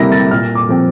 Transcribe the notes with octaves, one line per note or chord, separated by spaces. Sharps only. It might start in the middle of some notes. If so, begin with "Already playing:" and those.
Already playing: C3 G3 A#3 E4 A#6
A6
A#2 F6
D6
F3 C4